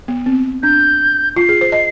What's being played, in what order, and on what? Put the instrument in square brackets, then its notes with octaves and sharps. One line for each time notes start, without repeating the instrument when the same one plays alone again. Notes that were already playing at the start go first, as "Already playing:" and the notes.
[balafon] B3
C4
[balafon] D4 [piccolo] G6
[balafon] F4 [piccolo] C7
[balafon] G#4
C5
D#5